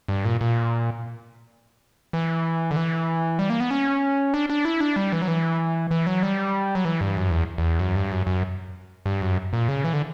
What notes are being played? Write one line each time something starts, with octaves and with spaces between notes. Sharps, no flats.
G2
A#2
A#2
E3
D3
E3
G3
A#3
B3
C#4
D4
D4
E4
D4
G3
E3
F#3
E3
E3
F#3
G3
F#3
E3
G2
F#2
E2
E2
F#2
G2
F#2
F#2
G2
F#2
A#2
C#3
E3
D3